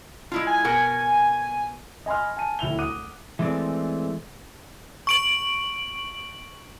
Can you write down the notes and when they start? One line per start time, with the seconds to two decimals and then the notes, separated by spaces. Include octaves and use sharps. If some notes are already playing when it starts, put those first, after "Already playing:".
0.32 G#3 E4 F4
0.47 G#5
0.65 B2 A#4 F#5
2.06 D#5 G#5 B5 C6 F6
2.37 G#5 A5 D#7
2.59 D1 E4 F7 G7
2.79 F#5 D6 D#6 F#6 D#7
3.39 E3 G#3 A3 C4 D5
5.07 C#6 D7 F#7